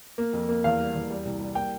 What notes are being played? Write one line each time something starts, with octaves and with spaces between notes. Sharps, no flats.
A#3
F2
A#3
E2 F5
G3
E2
G3
C2
G3
A#3 G5